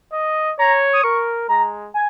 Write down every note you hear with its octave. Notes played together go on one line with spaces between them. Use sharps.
D#5
C#5 A#5
D#6
A#4 C#6
G#3 A#5
G#5